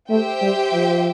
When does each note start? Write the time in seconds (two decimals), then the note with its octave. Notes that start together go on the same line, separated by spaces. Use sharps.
0.10 A3 G4 C5 E5 G5
0.42 G3
0.73 F3